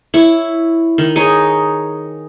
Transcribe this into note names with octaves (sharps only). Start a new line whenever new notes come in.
E4 C#5
D#3
D#4 G#4 C#5 G#5